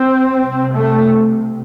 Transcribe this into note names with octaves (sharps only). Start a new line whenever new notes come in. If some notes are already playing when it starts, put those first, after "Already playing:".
Already playing: C4
C2 C3
A3